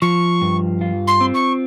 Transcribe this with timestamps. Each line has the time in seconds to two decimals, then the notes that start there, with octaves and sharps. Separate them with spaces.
0.01 F3 C#6
0.42 G2
0.81 F4
1.07 C6
1.21 C4
1.34 C#6